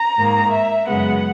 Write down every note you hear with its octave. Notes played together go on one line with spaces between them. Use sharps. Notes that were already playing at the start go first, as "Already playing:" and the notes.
Already playing: A#5
G#2 D#3 A#3
E5
F#2 C#3 G#3 B3 F#5